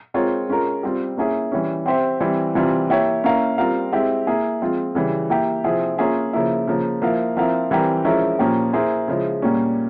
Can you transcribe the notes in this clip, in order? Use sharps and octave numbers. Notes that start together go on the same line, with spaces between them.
G#3 C4 F4 A#4 C#5
G#3 C#4 F4 A#4
G3 C4 F4
A#3 C#4 E4 G#4
E3 G3 C#4
C4 G4 C5 E5
E3 G3 C4
C3 E3 G3 C4 F4
A#3 E4 G4 C#5
A#3 C#4 E4 A#4 F5
G3 C4 F4 A#4 F5
G#3 C4 E4 G4
A#3 E4 G#4
F3 G#3 C4 F4
C#3 E3 G3
A#3 E4 G4
C3 F3 C4 E4 G#4
A#3 C#4 F4 G#4 E5
C#3 F3 A#3 E4
C#3 F3 A#3
F3 A#3 E4 A#4 F5
F3 C4 E4 A#4 F5
E3 G3 C4 G4 A#4
F3 G#3 C#4 E4 A#4
A#2 F3 A#3 C#4 G4
A#3 E4 G#4 C5
C#3 F3 G#3 E4
A#2 G3 A#3 C#4